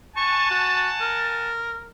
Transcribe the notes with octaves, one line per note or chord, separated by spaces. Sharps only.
F#5 G#5 A5 C#6
F#4
A#4